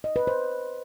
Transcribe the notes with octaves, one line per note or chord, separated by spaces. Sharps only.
D#5
B4
C5